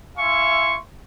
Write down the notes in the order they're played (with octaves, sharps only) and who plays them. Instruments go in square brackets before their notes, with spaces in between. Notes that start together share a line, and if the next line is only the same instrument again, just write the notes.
[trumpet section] E4 E5 F5 G#5 C6 C#6